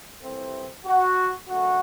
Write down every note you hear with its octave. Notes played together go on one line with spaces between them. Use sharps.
C2 C3 E3 A3 C4
F#4
F#2 D3 A3 F#4